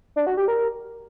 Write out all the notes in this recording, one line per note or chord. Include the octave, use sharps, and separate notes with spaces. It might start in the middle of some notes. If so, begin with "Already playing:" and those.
D4
F#4
G4
A#4